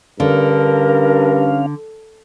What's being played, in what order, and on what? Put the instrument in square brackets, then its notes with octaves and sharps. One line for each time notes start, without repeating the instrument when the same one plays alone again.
[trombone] G2 [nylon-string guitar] D3 [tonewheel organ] C#4 F5 [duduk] A#4